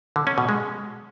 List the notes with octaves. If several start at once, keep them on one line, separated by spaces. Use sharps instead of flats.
D3
C#4
B2
G#3